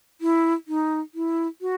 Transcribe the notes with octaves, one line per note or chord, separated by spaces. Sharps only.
E4
D#4
E4
F#4